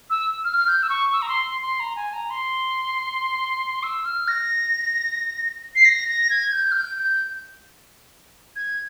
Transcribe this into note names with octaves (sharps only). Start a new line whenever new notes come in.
E6
F6
F6
G6
E6
C#6
E6
A#5
C6
C6
C6
A#5
G#5
A#5
C6
E6
F6
A#6
C7
A#6
A#6
G#6
G6
F6
G6
G6
G#6